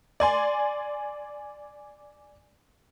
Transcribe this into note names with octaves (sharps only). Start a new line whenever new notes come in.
D5 G#5 C6